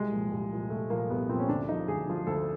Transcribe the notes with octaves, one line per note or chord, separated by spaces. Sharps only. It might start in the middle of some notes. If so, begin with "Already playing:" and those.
Already playing: C2 G#3
A#2 F3
C2
A#2 F3
C2 A3
A#2 F3 A#3
C2 B3
A#2 F3 C4
C#4
D2 D4
D3 F3 D#4
D2 G#4
D3 F3
D2 A4